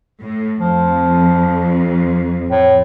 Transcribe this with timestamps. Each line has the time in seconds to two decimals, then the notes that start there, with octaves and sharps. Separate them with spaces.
0.19 A2
0.59 F2 F3
2.51 A2